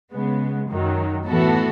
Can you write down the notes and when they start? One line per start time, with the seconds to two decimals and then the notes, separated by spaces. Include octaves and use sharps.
0.13 C#3 G#3 B3
0.70 F#2 D#3 F#3
1.28 A2 E3 B3 F#4 A4